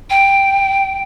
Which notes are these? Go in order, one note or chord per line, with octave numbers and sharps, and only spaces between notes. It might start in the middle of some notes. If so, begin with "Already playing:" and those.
G5